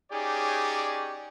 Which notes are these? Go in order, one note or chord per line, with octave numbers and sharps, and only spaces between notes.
C#4 D#4 G4 G#4 C#5 D5